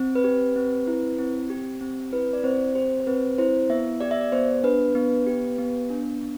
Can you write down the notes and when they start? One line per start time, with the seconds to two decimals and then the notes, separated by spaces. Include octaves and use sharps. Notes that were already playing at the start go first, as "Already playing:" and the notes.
Already playing: C4
0.15 B4
0.24 G4
0.56 C4
0.87 E4
1.18 C4
1.50 G4
1.81 C4
2.12 E4 B4
2.33 D5
2.44 C4 C5
2.75 G4 C5
3.00 C5
3.07 C4 B4
3.38 E4 C5
3.70 B3 E5
4.01 G4 D5
4.11 E5
4.21 D5
4.32 B3 C5
4.63 D4 B4
4.95 B3
5.27 G4
5.59 B3
5.90 D4
6.21 B3